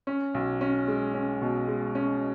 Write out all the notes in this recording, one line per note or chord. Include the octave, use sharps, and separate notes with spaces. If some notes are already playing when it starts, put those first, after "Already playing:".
C#4
B1
C#4
G#3
C#4
B2
G#3
C#4